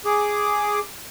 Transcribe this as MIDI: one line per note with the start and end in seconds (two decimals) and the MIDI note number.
0.05 0.79 68
0.05 0.79 86